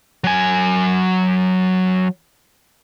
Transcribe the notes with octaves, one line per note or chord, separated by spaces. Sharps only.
F#3 G#5